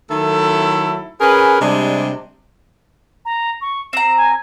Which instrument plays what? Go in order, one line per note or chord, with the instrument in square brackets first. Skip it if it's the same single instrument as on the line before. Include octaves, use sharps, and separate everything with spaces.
[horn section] D#3 F#3 A3 E4 A4
C#4 G#4 A#4 B4
C3 G3 G#3 D4
[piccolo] A#5
C#6
[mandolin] C4 A#5 [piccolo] E7
[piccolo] G#5